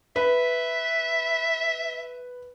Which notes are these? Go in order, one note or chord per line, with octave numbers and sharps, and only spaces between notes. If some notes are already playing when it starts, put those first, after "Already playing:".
B4 E5